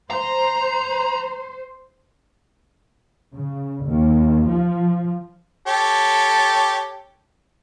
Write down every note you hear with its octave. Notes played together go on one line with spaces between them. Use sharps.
C5 A#5
C#3
D#2
F3
G4 A4 C#5